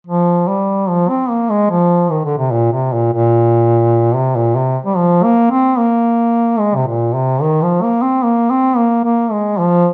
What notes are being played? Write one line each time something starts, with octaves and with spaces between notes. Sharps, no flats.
F3
G3
F3
C4
A#3
G#3
F3
D#3
D3
C3
A#2
C3
A#2
A#2
C3
A#2
C3
G3
F3
A#3
C4
A#3
G#3
C3
A#2
C3
D#3
F3
A#3
C4
A#3
C4
A#3
A#3
G#3
F3